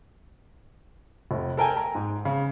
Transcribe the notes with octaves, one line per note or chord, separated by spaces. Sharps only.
F1
A4 A#4 G5 G#5
A#5
G#2
C#3